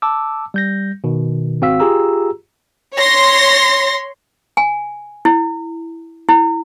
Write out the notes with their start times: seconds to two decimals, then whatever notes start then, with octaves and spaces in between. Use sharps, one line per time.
0.02 A5 D6 E6
0.54 G3 G6 A#6
1.04 B2 D#3
1.61 G#1 C4 F#4 F5 E6 B6
1.80 F4 G4 G#4 A#5 E6
2.96 C#5 C6 A#6
4.57 G#5
5.25 E4
6.29 E4